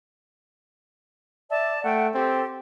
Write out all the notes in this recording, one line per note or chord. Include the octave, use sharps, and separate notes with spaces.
D5 E5 A5
A3 F#5 G5
C4 G4 A4